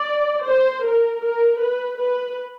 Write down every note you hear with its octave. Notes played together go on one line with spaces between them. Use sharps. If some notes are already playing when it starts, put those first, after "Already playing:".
Already playing: D5
C5
A#4
A#4
B4
B4